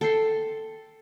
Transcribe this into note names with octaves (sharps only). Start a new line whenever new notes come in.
A4 G5 C6